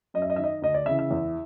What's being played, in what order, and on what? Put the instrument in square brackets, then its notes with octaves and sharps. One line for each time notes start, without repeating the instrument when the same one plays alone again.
[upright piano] F#2 D#5
E5
D#5
D#3 E5
D#5
D2 D#5
D5
C#3 E5
E3
E5
E2